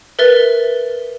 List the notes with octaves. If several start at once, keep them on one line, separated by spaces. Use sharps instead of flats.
A#4 B4 E5 A6 G7